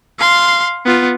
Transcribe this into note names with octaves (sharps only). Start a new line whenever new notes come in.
F5 C6
B3 F4